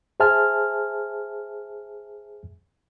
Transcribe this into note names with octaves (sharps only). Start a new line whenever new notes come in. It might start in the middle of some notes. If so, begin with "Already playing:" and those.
G#4 C5 E5 G#5 A5 F6